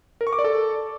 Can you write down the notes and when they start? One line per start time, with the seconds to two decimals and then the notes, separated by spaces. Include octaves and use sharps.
0.21 A#4
0.27 C#6
0.33 D6
0.39 D5
0.44 A4